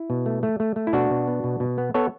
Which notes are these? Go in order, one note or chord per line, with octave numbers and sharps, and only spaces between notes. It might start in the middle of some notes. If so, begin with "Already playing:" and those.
Already playing: E4
B2
A3
A3
A3
A3
E4
B2 D4 F#4
B2
B3
B2
B2
B3
B3 A4 C#5